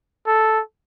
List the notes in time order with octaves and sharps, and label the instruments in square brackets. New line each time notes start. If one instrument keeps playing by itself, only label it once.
[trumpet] A4